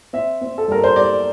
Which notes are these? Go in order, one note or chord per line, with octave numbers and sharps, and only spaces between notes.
C4 E5
C4
A4
G2 A#4
C5
G3 D5